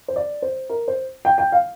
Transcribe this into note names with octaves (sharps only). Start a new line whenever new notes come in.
C5
D5
C5
A#4
C5
G5
G5
F5